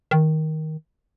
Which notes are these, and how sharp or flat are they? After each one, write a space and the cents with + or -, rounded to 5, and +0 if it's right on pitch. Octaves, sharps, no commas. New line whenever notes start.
D#3 +10